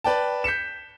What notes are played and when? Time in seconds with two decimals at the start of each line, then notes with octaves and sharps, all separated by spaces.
0.04 B4 D5 G5 A5
0.44 G6 B6 C#7 E7